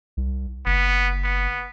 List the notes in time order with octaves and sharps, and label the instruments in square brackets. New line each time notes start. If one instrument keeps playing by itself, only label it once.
[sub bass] C2
[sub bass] F#1 [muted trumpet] B3
[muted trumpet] B3